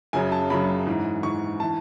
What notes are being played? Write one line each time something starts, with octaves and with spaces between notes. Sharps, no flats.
F#2 C#3 F#3 G#5
A5
F#2 C#3 F#3 B5
G#2 E3
G#2 E3 C#6
E3 A5